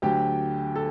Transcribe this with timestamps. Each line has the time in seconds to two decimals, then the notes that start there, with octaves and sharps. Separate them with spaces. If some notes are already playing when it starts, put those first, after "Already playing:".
0.02 D2 D3 F#3 G4 G5
0.76 A4